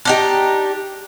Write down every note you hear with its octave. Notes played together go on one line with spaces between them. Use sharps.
D4 D#4 G4